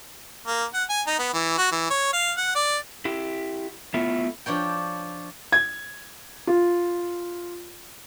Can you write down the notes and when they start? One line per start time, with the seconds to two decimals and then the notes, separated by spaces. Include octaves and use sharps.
0.47 A#3
0.74 F#5
0.90 G#5
1.07 D#4
1.19 B3
1.33 E3
1.58 F#4
1.72 E3
1.90 C#5
2.13 F5
2.37 F#5
2.55 D5
3.05 E4 G4
3.94 A3 B3 E4 F4
4.46 F3 D4 C#5 G5
5.52 G#6
6.47 F4